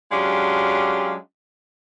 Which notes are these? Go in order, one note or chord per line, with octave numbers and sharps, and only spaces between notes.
F#3 G#3 C#4 D4 F4 G4